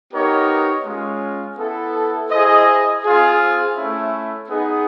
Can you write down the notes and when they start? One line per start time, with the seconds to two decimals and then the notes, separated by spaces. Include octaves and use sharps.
0.12 B3 D#4 G4 A#4 C#5
0.85 G#3 C#4 F4
1.57 B3 E4 A4
2.30 E4 G#4 C5 D#5
3.03 C4 F4 G#4
3.76 A3 C#4 E4
4.49 B3 D#4 G#4